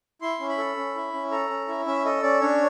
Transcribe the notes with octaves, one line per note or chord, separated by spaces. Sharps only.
E4 C6
C#4
B5
A4
C#4
E4
C#4
A4 A#5
C#4
E4
C#4 E5
A4 D#5
C#4 D5
D4 C#5